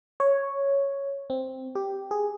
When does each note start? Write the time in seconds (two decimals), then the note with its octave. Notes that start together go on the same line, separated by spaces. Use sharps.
0.20 C#5
1.30 C4
1.75 G4
2.11 G#4